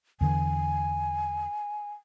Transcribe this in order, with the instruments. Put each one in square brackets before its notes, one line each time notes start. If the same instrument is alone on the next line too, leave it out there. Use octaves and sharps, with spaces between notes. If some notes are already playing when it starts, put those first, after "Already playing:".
[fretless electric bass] E2 D3 E3 [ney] G#5